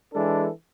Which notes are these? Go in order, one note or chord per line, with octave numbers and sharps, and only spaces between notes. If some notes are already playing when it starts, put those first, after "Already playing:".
E3 G#3 D4 A4